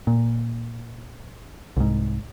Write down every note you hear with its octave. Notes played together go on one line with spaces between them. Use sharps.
A#2
C2 G#2